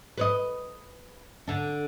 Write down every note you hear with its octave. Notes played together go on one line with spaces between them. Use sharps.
B4 C#5 D#5
D3 D4